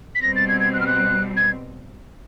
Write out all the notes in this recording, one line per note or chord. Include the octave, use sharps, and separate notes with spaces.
B6
B2 G3 C4 A#6
A6
G#6
G#6
F#6
F6
F#6
G#6